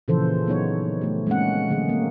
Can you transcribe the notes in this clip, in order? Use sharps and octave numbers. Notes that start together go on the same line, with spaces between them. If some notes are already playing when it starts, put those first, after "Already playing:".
A#2 C#3 E3 F3 A4 C5
F#3 B3 D#4 C#5
A3 G4
G#3 A#3 C4 C#4 F#5
D3 F#3 A3 C#4 G#4
A#3 C4